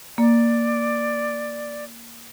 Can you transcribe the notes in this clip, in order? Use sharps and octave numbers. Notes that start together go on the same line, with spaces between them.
A#3 D5